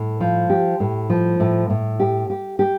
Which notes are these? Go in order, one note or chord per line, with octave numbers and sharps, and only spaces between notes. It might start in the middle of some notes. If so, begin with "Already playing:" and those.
Already playing: A2
F3
G4
A2
F3
A2
A2
G4
G4
G4